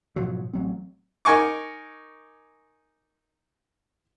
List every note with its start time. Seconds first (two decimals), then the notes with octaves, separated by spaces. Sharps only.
0.16 G#2 B2 F3 F#3
0.53 A1 F#3 C4
1.25 D#4 A#4 G#5 C#6 D6